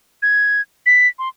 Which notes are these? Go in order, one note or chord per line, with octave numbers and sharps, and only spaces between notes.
G#6
B6
C6